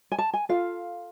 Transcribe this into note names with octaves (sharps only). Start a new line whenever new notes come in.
G#5
A5
G#5
F4 A4 F5